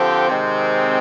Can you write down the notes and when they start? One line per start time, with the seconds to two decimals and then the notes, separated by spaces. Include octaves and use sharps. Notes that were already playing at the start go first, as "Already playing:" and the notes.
Already playing: D3 F3 C4 G4
0.27 C3 D#3 G#3 C4